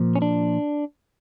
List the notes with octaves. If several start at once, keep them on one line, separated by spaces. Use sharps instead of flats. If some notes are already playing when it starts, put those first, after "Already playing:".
Already playing: A#2 F3
C#4
D4